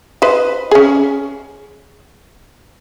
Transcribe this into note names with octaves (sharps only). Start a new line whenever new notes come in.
B4 C5 D#5
C#4 G#4